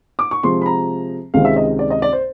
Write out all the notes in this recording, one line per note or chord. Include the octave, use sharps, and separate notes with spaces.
D6
C#6
C3 F3 G#3 C6
B5
A#5
C#2 C3 D#3 G#3 C4 F5
E5
D#5
D5
D#5
D5
C5